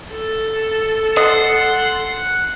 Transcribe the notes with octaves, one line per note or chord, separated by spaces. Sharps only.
A4
D#5 F#5 C6